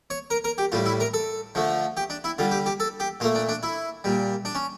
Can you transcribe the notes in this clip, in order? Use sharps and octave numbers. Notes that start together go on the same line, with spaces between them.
C#5
A#4
A#4
G4
A2 G3 F4
E4
A#4
A4
D3 F3 A3
G4
D4
E4
D3 G3 F4
G4
G4
A4
G4
A#2 A3 F4
D4
D4
E4
A#2 G3
D4
C#4